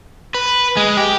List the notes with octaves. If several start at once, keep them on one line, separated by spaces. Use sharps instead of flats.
B4
G#3
G4